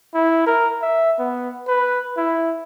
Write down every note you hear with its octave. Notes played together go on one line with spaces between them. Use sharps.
E4
A#4
E5
B3
B4
E4